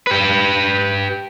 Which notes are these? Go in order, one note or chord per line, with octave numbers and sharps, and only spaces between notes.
G4 B4